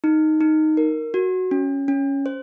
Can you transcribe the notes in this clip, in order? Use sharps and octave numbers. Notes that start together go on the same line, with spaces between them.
D#4
D#4
A#4
F#4
C#4
C#4
C5